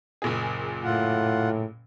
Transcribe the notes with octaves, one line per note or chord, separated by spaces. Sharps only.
F#1 A#2 G#4
A2 F4 F#5